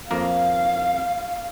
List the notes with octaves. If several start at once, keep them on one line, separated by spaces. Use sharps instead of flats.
F2 A#3 A#4 F5